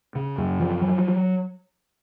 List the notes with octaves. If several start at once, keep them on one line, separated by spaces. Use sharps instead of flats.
C#3
F#2
F3
F#3